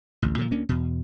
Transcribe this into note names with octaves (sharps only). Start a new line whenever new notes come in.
A1 D2
A#2 D3 D#3 F3
D2 A#3 C#4 D4
E2 B2